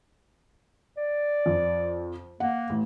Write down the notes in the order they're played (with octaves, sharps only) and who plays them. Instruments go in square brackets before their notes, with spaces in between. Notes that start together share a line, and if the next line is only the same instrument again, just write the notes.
[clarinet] D5
[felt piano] F2
[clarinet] A#3 [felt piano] F#5
[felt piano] A1